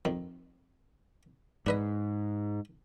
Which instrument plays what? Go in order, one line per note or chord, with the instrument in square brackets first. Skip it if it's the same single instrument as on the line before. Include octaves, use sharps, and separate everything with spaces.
[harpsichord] F2 D#3
[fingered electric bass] G#2 [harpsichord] D4 B4 D#5